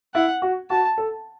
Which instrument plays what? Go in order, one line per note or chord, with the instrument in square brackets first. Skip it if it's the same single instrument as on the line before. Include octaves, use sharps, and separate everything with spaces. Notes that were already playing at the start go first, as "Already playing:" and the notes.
[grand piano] E4 [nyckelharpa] F#5
[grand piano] F#4
[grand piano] F#4 [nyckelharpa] A5
[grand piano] A4